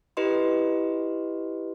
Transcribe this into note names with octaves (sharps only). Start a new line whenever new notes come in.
E4 G4 B4 D#5 C6